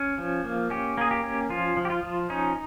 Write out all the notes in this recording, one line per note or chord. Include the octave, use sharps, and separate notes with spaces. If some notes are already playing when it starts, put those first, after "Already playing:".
Already playing: C#4
F3
A#3
C#4 G4
A#3 G#4
G4
C#4
F3 F4
F3
G4
F4
F3
C#4 D#4